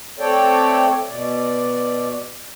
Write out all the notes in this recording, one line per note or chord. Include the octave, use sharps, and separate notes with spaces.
A3 C4 A4 C#5 D5 G5
B2 D5